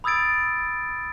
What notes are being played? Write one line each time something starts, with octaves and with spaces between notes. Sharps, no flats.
B5 D#6 E6 G#6 A6 D7